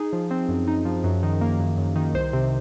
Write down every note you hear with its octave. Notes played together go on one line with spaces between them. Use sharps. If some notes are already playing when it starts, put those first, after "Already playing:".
Already playing: D#4 G#4
F3
C4
F#2
D#4
F3
F#2
D#3
A#3
F#2
F#2
D#3
C2 C5
C3